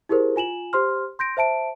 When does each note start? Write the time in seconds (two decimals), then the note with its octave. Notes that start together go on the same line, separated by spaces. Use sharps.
0.09 E4 G4 G#4 A#4 C5
0.36 F4 G#5 E7 F#7
0.73 G4 C5 C6 F6
1.19 C6 G6 A#6 D7
1.37 C5 E5 A5 D7